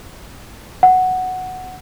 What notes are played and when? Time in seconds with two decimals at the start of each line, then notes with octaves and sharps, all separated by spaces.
0.83 F#5